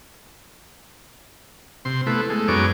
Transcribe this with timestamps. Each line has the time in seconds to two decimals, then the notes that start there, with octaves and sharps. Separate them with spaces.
1.85 C3 C6
2.07 A3 B3 E4
2.30 G#3 A3
2.48 F#2 G#3 B3 D#4 C#5 D6